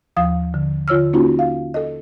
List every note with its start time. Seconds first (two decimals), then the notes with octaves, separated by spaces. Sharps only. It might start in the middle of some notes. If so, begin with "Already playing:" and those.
0.17 D#2 F3 F5 D#6
0.54 D3
0.88 D3 F4 C#5 E6 F6
1.13 A#3 C#4 D#4 F4 F#4
1.39 F5
1.74 A4 D#5